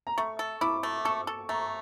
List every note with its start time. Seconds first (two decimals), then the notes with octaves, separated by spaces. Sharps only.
0.07 A#5
0.18 A3 C#6
0.39 A4
0.61 E4 D6
0.83 A3
1.05 A4 C#6
1.27 A4
1.49 A3 A#5